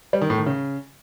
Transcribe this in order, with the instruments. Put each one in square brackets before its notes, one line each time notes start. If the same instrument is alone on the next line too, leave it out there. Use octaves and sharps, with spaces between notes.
[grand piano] G3
D#3
A2
D#3
C#3